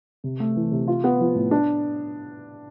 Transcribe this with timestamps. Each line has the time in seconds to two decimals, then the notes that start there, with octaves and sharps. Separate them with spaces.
0.24 C3
0.40 A3
0.56 E3
0.72 C3
0.88 F4
1.04 B3
1.20 F3
1.35 A2
1.51 D4